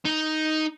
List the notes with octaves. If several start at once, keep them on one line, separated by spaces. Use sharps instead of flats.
D#4